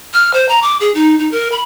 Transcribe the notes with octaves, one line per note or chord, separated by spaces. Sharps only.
F6
C5
A#5
D6
G#4
D#4
D#4
A#4
B5